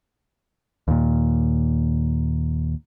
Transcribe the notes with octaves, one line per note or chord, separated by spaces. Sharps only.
D#2 A#2